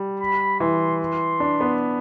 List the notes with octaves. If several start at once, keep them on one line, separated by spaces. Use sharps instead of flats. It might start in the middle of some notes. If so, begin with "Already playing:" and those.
Already playing: G3
B5
E3 C6
C6
D4
B3